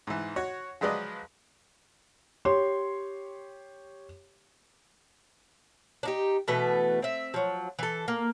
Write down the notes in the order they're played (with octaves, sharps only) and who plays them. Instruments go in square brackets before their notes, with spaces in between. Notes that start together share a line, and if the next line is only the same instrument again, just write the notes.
[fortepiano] G#2 E3
F#4 C#5
F3 F#3 G#3 B4 D5 D#5
[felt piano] G4 C#5 C6
[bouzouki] D4 D#4 G4
B2 E3 A3 B4
C4 E5
F3 F#3
E3 A4
A#3